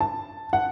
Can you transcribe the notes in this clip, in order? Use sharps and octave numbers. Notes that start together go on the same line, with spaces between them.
A5
F#5